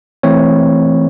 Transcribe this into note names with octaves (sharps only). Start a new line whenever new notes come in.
E3 A3 C4 C#5